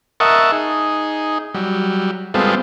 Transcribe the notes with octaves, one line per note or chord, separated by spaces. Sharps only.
A#4 D#5 E5 F#5 A5 C#6
D#4 G#4
F#3 G3
G3 G#3 B3 C4 F4 A4